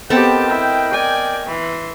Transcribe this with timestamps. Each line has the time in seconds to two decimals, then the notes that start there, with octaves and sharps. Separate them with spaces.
0.10 B3 C4 G4 A4 A#4 D#5 G5 A5
0.49 E4
0.92 D5 G#5
1.46 E3 C6